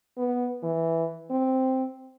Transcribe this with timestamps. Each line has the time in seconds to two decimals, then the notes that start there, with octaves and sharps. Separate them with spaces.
0.17 B3
0.63 E3
1.30 C4